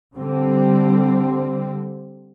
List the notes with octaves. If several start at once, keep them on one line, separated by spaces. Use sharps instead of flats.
D3 G3 C4